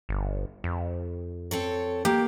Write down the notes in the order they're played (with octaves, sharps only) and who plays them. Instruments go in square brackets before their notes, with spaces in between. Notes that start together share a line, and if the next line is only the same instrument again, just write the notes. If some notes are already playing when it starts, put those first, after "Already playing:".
[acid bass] G1
F2
[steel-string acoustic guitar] C4 A4 C#5
[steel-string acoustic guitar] A#3 [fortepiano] G4